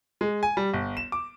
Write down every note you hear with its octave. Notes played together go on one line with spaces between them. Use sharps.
G#3
G#5
G3
G1
E7
D6